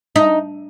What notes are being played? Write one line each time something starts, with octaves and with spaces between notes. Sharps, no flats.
D#4